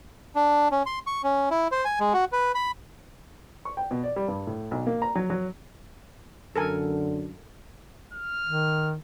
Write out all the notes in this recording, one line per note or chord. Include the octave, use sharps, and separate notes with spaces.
D4
C#4
C6
C#6
C#4
E4
C5
G#5
G#3
F#4
B4
B5
C#6
G5
B2
D5
G3
G2
A2
B1
A#3
A#5
F#3
F#3
F#2 D3 A4 A#4 G#5
F6
D#3